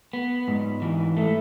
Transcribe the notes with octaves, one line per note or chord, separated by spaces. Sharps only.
B3
G#2
E3
A3